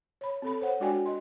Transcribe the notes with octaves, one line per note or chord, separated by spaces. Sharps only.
C#5 B5
C4 A4 B5
C5 C#5 F#5
G#3 D4 F#4 D5 G5 G#5
D#5 C6